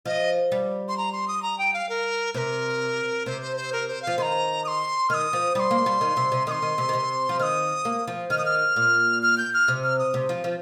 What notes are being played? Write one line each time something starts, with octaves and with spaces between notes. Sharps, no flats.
F3 D#5
G3
C6
A#5
C6
D#6
A#5
G5
F5
A#4
C3 A#4 C5
C3 C5
C5
C5
A#4
C5
F5
F3
D#3 A#5 C6
D#6
C6
D#3 D#6 F6
F3
G3 C6 D#6
A#3
G3
D#3
C3
C3
D#3 C6 D#6
D#3
C3
D#3
C3
F3
D#3 D#6 F6
A#3
F3
D#3 F6
D#6
F6
A#2
F6
G6
F6
C3
F6
D#6
C3
F3
F3